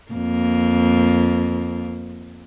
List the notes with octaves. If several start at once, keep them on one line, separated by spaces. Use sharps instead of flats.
F2 A#3